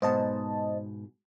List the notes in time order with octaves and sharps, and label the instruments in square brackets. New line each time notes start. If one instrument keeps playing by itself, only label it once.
[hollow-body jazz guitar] G#2 B2 [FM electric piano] C5 D#5 A5